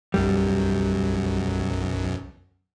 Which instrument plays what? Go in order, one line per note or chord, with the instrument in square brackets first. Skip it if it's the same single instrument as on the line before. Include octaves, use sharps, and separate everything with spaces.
[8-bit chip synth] B1 F#2 [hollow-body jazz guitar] G3